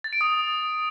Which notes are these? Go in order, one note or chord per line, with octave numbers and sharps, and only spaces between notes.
A6
D7
D#6